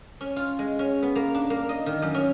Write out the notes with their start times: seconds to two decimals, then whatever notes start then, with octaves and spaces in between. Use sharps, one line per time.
0.21 C#4
0.36 F4
0.59 G#3
0.79 C#4
1.02 B3
1.16 A#3
1.35 D4
1.50 A#3
1.69 D#5
1.86 D#3
2.02 F#2
2.15 C#4